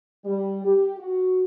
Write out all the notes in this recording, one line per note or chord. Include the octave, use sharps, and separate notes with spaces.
G3
G4
F#4